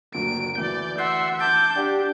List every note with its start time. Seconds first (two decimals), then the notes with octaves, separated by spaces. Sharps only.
0.14 F#1 D2 A#2 D7
0.58 D2 E3 D5 G6
0.99 E5 F#5 C6
1.40 A5 D6 G6
1.76 D4 G4 D5 F#5 G5